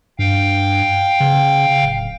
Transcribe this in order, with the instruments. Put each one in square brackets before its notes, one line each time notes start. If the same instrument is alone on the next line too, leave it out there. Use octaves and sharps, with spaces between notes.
[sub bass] G2 [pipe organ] F5 G5
[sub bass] C#3
D1